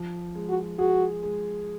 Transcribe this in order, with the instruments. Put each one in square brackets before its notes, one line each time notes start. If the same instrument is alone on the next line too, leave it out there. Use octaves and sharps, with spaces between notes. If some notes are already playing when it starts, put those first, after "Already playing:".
Already playing: [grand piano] F3
G#3
[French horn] F#4
[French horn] F#4 [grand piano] G#4
[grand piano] G#3